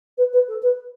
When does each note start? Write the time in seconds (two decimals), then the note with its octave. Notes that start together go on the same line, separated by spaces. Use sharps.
0.17 B4
0.33 B4
0.48 A4
0.62 B4